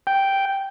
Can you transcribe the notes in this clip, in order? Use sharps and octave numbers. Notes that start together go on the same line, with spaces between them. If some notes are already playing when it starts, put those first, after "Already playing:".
G5